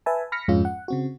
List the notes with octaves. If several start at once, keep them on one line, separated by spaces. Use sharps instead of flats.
B4 E5 G#5 A5
B5 F6 A#6 B6 C#7
F2 G#2 G#3 C#4 F4
F#5
C#3 C4 F#4